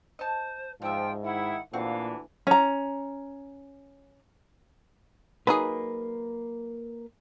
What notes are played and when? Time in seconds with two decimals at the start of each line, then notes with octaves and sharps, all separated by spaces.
0.19 C5 D#5 A5
0.82 G#2 F3 G3 E5 G5
1.24 D#3 E4 F#5
1.73 D2 A#2 D3 E3 C4 F#4 F5
2.47 C#4 A#5
5.47 F#3 A#3 D#4 G#4 B4